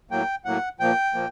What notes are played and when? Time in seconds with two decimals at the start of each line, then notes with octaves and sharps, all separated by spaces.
0.11 A2 F#3 A#3 G5
0.45 A2 F#3 A#3 F#5
0.80 A#2 F3 A#3 G5
1.14 A#2 F3 A#3